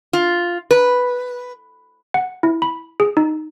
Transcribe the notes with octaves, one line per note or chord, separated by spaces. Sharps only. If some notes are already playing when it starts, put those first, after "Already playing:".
F4
B4
F#5
E4
B5
G#4
D#4